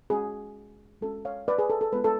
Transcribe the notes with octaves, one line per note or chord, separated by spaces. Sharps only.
G#3 C#4 F#4 G#4
G#3 C#4 F#4 A4
C#5 F5
B4 D5
G#4 B4
A4
A4
G#3 B3 F4 B4
A4